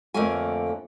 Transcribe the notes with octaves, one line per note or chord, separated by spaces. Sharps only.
F2 D3 A3 A#3 C#5 G#5